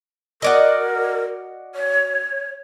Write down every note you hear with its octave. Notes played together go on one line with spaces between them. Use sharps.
F#4 A#4 D5 D#5
C#5